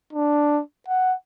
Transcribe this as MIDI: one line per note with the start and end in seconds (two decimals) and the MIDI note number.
0.13 0.61 62
0.88 1.14 78